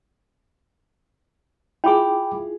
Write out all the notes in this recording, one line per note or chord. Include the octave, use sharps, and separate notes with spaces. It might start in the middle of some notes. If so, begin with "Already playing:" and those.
E4 F4 G#4 G5 B5 D6